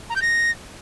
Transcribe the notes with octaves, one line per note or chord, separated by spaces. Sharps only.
A#5
G6
A#6